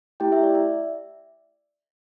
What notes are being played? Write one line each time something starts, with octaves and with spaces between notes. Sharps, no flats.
A3 E4 G4 G5
E5
D5
E5